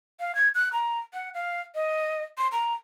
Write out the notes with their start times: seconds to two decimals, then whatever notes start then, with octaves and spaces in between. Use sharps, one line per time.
0.20 F5
0.35 G#6
0.55 F#6
0.73 A#5
1.13 F#5
1.34 F5
1.75 D#5
2.38 C6
2.52 A#5